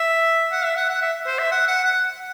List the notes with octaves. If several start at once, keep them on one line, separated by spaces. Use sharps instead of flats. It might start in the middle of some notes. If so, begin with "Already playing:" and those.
Already playing: E5
F#5
E5
F#5
F#5
E5
C5
E5
F#5
F#5
F#5